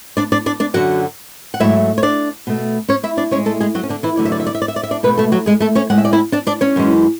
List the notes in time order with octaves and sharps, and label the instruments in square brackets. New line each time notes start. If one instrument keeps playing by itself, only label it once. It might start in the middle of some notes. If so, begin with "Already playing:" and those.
[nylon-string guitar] D4 D5
D4 D5
D4 D5
D4 D5
F#2 D3 F#3 F#4 F#5
F#5
G#2 F#3 A3 E4 E5
C#5
D4 D5
B2 A3
C#4 C#5
E4 E5
D4 D5
A2 G#3 C#4 C#5
A3 A4
G#3 G#4
F#3 F#4
C#4
D3 D4
E3 E4
E2 D3 F#3 A3 D5
E5
D5
E5
D5
E5
D5
E5
D5
E5
D4 D5
B2 A3 B3 B4
A3 A4
F#3 F#4
G#3 G#4
A3 A4
C#4 C#5
A2 G#3 F#5
E5
D5
E4 E5
D4 D5
D4 D5
C#4 C#5
F#2 E3 G#3